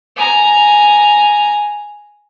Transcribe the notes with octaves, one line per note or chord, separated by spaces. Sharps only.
G#5 A#5